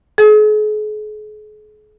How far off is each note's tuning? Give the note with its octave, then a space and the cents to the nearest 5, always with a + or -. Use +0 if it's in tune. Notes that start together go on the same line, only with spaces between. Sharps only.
G#4 +40